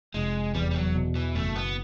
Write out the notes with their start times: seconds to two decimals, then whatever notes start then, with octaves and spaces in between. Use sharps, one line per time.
0.14 F1 G#3
0.54 E2 G3
0.71 G3
0.75 F#3
0.95 B2
1.16 E3
1.35 F#1 A3
1.56 B3